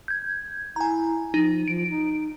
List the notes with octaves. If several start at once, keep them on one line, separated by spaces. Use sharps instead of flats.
G6 G#6
E4 G#5 A#5
F3 D#4
F3 D7
D#4